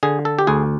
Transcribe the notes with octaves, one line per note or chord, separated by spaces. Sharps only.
D3 G#4
A4
G4
D2 G#4